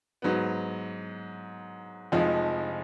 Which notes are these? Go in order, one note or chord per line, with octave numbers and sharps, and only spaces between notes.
G#2 F#3 B3
F1 F2 F3 G#3 D#4